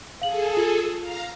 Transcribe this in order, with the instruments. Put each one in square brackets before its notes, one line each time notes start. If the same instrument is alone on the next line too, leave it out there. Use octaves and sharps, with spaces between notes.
[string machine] G#4 A4 [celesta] F5 F#7
[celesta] F4
[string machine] F5 A#5